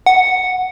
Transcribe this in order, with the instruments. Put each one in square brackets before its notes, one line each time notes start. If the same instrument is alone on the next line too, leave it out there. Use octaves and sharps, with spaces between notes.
[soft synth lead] F#5